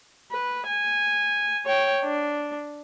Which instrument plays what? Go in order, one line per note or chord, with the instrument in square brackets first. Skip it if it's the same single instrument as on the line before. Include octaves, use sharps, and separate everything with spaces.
[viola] B4
G#5
C#5 G5
D4